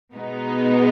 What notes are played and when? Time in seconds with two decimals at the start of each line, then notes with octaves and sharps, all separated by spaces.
0.13 B2 G#3 B3 D#4